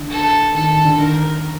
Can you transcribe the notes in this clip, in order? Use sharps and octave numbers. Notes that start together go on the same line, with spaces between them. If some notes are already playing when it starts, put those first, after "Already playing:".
Already playing: D3
A4
D#3 A4
D#3
D3
D#3 A#4